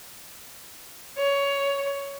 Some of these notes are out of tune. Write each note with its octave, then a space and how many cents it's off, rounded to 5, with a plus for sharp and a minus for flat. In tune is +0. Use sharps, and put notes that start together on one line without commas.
C#5 +15